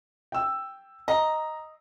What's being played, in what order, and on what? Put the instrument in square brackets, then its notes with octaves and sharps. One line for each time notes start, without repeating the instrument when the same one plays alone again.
[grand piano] G5 E6
[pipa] D#5 [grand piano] A#5